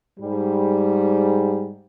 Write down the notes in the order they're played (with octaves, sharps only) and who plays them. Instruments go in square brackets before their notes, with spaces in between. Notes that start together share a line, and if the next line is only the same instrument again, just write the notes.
[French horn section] G#2 G3